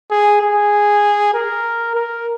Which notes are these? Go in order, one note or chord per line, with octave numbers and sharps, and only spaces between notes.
G#4
G#4
A#4
A#4